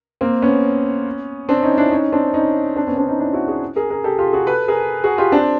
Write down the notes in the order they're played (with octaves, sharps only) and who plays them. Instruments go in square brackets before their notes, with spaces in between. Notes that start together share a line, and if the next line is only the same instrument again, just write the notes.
[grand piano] A#3 C4
B3 C#4
C4 D4
C#4 D#4
D4 E4
C#4 D#4
C4 D4
C#4 D#4
C4 D4
B3 C#4
C4 D4
C#4 D#4
D4 E4
E4 F#4
F#4 G#4
G#4 A#4
G#4 A#4
G4 A4
F4 G4
F#4 G#4
A4 B4
G#4 A#4
F#4 G#4
F4 G4
C4 D4